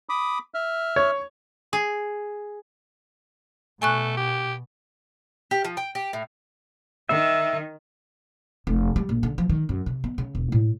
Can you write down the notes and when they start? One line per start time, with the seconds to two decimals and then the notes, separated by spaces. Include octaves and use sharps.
0.09 B5 D6 D#6
0.54 E5 F6
0.96 C#5
1.73 G#4
3.82 B2 A3 G#5 C#6 F#6
4.17 G4
5.51 G4
5.65 F3
5.77 G5
5.95 G4
6.13 A2
7.09 D#3 E5
8.67 F1
8.96 G3
9.09 A#1
9.23 D3
9.38 F3
9.49 D#3
9.69 F#2
9.86 C3
10.04 B3
10.18 C#3
10.35 E1
10.52 A2